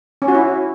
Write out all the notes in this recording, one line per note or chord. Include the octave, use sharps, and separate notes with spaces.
C#4
F#4
E4